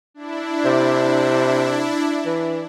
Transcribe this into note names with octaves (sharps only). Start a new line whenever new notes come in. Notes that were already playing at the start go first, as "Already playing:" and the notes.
D4 E4
C3
E3